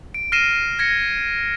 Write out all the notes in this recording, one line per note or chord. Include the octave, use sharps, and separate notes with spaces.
D7
F6 A#6 C7 D#7 E7
G#6 A#6 C#7